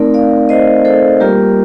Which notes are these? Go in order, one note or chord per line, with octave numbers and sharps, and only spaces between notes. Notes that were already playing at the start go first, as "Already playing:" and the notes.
Already playing: A3 C4 D#4 A#4 D5
D5 F5
C5 D#5
A4 C5
G3 A#3 F4 G4 A#4